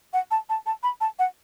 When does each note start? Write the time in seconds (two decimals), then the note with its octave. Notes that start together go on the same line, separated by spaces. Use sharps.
0.13 F#5
0.31 A5
0.49 A5
0.66 A5
0.83 B5
1.01 A5
1.19 F#5